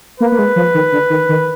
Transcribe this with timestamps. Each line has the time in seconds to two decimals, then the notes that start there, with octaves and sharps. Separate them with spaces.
0.20 A#3 B4
0.32 A#3
0.39 G#3
0.56 F3
0.74 D#3
0.92 D3
1.10 D#3
1.29 D#3